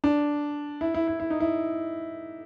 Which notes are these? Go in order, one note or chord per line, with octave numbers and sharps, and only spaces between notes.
D4
E4
E4
E4
E4
D#4
E4